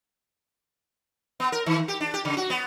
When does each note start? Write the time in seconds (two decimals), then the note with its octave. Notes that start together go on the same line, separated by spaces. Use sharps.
1.40 B3
1.52 A#4
1.66 D#3
1.88 G4
2.00 D4
2.14 G4
2.25 C#3
2.37 F#4
2.50 B3